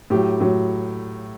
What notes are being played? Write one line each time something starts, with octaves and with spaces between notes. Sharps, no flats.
A2 F#3 G4
A2 F#3